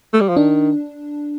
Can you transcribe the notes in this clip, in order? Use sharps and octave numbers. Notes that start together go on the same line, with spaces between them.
A3
G3
F3
D#3 D4